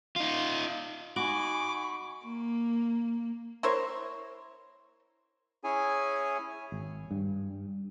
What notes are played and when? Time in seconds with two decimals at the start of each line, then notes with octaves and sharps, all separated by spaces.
0.16 D#4 F4
1.16 D#4 F#4 G#5 B5 C#6 D6
2.25 A#3
3.63 E4 A#4 C5 C#5
5.64 C#4 E4 G#4 C#5 G#5
6.72 G#1
7.11 G2